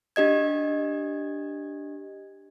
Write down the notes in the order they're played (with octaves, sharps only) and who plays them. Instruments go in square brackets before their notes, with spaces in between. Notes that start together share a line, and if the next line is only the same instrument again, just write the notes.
[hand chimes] D4 G4 D#5 G#6